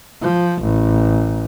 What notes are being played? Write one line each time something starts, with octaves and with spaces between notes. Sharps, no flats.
F3
A1